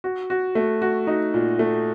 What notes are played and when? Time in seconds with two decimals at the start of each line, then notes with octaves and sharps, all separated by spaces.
0.04 F#4
0.30 F#4
0.55 A3
0.82 F#4
1.07 D#4
1.34 A#2
1.59 A3